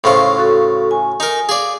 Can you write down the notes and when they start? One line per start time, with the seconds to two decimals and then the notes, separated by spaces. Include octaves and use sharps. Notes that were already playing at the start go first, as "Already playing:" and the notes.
0.04 A2 C#3 F4 C5
0.38 F#4 A4
0.91 G#5
1.20 D#4 A#4
1.49 G#4 D5 F5